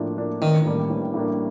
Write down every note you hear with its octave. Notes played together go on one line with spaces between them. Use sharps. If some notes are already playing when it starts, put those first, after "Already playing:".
Already playing: A2 F3 A#3 D4
F3 A#3 D4
A1 D#3
A2 G3 A#3 D4
A1
A2 G3 A#3 D4